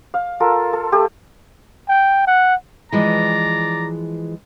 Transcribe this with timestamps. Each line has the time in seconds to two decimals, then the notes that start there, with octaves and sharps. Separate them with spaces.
0.14 F5
0.40 F4 A4 A#4
0.73 A4
0.92 A3 G4
1.89 G5
2.27 F#5
2.92 E3 F3 G#3 D5 A#5